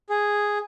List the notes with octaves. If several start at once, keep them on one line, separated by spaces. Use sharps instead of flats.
G#4